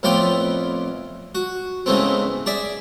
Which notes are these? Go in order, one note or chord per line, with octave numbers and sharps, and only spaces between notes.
F2 A2 B3 F4 D5 G5
F#4
G#2 C#3 E3 A3 B3 C4
G#4 D5 E5